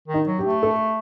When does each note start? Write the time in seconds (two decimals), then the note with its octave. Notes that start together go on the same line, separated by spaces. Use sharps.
0.08 D#3
0.14 D#4
0.27 F#3
0.39 G4
0.45 A3
0.63 A4